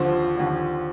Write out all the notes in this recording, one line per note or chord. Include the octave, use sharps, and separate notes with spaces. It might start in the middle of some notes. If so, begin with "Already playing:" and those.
Already playing: D#2 D3 F3 C5
D#2 D3 F3